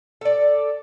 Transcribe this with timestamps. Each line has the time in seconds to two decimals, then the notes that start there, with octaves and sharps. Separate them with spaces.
0.21 A4 D5